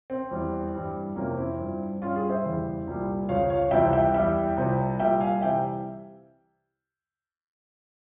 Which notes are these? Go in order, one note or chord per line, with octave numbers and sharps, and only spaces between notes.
C4
E2 E3 G3
G2 E3 G3
F2 C3 E3 A#3 C#4
C4 E4
G2 F3
G2 G3 C#4 F4
F4 G#4
C5 E5
E2 C#3 E3 G3
C2 A#2 G3
C#2 C#3 F3 C#5 F5
C#5 F5
C#2 C3 E3 G3 E5 G5
E5 G5
E2 E3 G3 E5 G5
C2 C3 F3
C2 A#2 G3 E5 G5
F5 G#5
C3 E3 G3 E5 G5